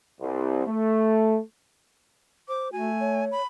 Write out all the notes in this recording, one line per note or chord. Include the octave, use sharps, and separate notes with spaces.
C2
A3
C5 D6
A3 F#4 G#5
C#5
B5